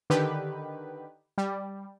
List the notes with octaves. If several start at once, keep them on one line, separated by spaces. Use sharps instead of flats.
D3 D#3 G4 B4
G3